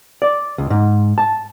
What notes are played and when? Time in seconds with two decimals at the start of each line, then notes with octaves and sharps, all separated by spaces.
0.22 D5
0.58 C#2
0.70 G#2
1.18 A5